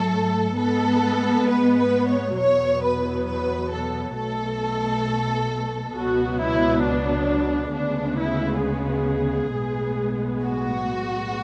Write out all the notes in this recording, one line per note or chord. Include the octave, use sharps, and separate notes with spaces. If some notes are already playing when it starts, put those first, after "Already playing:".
Already playing: G#2 F#3 A3 A4
G#2 G#3 B3 A4
B4
B4
C#5
E2 B2 F#3 B3 C#5
B4
B4
A4
B1 B2 A3 A4
C#2 B2 F#3 B3 F#4
E4
D4
D2 C#3 G#3 B3 D4
E4
G#4
B1 A2 G#3 B3
F#4